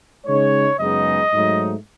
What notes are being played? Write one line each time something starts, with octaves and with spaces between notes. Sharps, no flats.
C#3 G#3 D#4 C#5
F#2 C#3 G#3 B3 D#4 D#5
G#2 F#3 A3 D#4